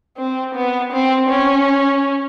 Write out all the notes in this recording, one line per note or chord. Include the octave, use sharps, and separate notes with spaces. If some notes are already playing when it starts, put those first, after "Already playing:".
C4
B3
C4
C#4